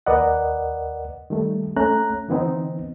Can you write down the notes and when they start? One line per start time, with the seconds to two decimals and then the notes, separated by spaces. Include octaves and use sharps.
0.06 D#2 A#4 B4 D5 D#5 F#5
1.30 D#3 G3 A3
1.77 A3 C#4 A#5 F#6
2.29 D3 E3 B3 C4 D#4